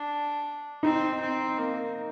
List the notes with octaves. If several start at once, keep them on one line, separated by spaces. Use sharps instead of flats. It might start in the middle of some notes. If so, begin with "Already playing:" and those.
Already playing: D4
C4 D#4
C4
A#3